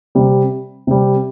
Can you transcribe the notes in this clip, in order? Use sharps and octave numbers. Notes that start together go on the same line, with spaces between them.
C3 G3
C3 G3